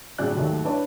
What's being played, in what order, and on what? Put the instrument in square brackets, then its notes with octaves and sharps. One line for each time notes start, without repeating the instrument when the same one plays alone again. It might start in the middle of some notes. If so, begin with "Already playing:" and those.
[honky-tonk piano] G1 A2 F#3 G#4 D5 F#6
D#2 G#2 F#3 A3 D#4
D4 E4 B4 C#5 D5 A5